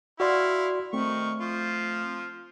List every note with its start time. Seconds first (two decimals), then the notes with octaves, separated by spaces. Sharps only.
0.20 E4 F#4 D5 F5 C6
0.93 D#3 A3 C4 C#6
1.40 F3 F4